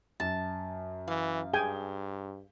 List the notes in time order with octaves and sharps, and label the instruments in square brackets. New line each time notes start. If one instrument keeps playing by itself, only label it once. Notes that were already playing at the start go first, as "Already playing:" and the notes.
[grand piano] F#2 [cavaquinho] A5
[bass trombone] E3 [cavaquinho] F5
[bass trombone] G2 [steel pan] G#4 G5 G#5 [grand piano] G7